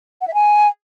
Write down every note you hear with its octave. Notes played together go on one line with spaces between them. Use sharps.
F#5
E5
G#5